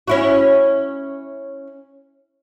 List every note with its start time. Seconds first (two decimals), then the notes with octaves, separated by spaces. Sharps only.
0.07 C#4 E4 F#4